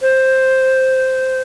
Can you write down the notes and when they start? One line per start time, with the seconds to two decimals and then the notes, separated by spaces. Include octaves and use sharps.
0.02 C5